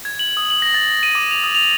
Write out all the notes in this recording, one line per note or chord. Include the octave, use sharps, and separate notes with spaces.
G#6
F#7
D#6
F#7
A#6
A6
A#6
D#7
D6
F7
D#6
F7